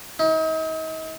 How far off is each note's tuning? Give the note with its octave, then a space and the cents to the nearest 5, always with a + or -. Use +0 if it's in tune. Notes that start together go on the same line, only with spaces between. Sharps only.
D#4 +40